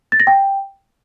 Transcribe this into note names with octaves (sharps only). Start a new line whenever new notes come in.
A6
A#6
G5